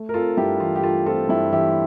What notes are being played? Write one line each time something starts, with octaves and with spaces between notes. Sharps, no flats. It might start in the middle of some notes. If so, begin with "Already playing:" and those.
Already playing: A3
A#4
C4 F4 A4
G2 E4 G4
E3 F4
G4
A3 F4
C4 F4 A4
G2 E4 G4
E3 E4 G4